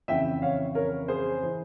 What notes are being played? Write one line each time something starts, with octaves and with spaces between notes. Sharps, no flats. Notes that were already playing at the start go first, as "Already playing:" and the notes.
F2 C#3 E3 E5 G5
C#5 F5
A#4 C#5
G#4 C5
E3